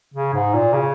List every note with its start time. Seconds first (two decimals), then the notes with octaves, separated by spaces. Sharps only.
0.14 C#3
0.33 G#2
0.54 A#2
0.73 C#3